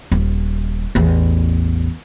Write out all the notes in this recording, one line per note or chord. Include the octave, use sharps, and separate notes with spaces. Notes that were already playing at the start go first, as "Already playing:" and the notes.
D#1
A1 E2